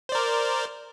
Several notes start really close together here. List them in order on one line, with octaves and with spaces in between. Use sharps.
C5 D5 A#4